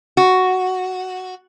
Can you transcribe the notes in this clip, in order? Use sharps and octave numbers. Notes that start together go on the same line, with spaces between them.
F#4